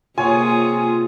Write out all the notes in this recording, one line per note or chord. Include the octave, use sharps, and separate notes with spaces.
C3 A#3 F4 G#4 C#5 G#5